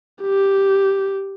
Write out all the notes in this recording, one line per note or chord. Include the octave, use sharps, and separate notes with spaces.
G4